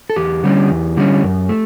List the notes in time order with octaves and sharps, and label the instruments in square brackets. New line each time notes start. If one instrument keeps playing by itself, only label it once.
[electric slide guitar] A4
E2 G4
D3 G3 C#4
E2
D3 G3 C#4
F#2
A3